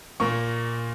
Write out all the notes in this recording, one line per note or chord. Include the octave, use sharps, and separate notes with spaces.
A#2 A#3 C#6